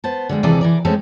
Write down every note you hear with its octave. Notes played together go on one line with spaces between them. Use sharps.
B3 C5 A5
D3 G3 G#3
D#2 C3 E3 G#4 A4 D5
E3 A#4 D5
G#3 A3 C4 C#4 A4